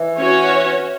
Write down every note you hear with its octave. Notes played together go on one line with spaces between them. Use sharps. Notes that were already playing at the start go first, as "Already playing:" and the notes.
Already playing: E3
C#4 F#4 C#5